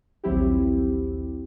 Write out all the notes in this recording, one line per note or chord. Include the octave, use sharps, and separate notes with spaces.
A#1 D#2 F#3 C4 E4 G4